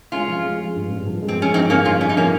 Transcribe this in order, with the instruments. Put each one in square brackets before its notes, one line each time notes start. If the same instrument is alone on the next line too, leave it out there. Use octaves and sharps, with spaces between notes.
[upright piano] G#3 [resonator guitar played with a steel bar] C#4 F4
[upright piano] F3
G#3
G#3
G2
G2
F3
G#3
[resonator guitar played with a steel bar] C4
[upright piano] G#3 [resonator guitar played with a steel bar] C#4
[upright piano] F3 [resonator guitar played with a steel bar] C4 D#4
[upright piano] G2 [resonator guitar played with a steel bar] A#3 C#4
[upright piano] G2 [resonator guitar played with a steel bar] C#4 F4
[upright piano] C4 [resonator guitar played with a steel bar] C#4
[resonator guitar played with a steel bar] D#4
[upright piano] F3 [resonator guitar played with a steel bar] A#3 C#4